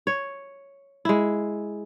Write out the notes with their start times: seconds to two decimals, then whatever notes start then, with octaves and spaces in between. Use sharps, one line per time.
0.07 C#5
1.05 G#3 E4